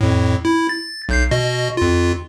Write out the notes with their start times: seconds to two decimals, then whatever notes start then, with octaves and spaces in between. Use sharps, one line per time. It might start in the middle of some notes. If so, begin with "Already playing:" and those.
0.01 F2 A2
0.45 E4
0.69 A6
1.09 B1 G6 C7
1.31 B2 F#4 D#5
1.77 F2 F4